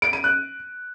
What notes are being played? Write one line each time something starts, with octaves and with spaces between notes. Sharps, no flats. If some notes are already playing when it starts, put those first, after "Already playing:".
D7
D#7
F#6